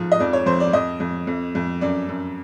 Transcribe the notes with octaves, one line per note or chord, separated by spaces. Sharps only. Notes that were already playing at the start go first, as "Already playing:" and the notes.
Already playing: G#2 F3
D#5
F2 D5
C#5
F2 C5
D5
F2 D#5
F2
F2
F2
F#2 D5
F#2